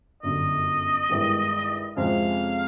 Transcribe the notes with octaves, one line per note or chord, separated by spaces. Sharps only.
G1 F#2 D3 D#5
G2 D#3 G#3 B3 E4
F2 C3 F3 G#3 C#4 F5